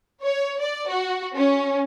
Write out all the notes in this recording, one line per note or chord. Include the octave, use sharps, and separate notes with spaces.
C#5
D5
F#4
C#4